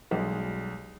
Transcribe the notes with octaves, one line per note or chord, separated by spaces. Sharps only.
B1 G3 G#3